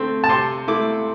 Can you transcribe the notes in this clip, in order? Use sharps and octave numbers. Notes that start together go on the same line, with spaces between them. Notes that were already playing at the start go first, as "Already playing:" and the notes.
Already playing: D3 A3 C4
A5
C3 C6
A3 E4 D6